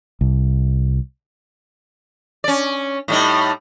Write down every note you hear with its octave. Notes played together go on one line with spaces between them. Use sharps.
C2
C#4 D5
A2 G3 D#4